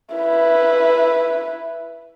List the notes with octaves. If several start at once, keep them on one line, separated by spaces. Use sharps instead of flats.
E4 B4